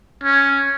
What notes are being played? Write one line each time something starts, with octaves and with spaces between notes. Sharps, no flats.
C#4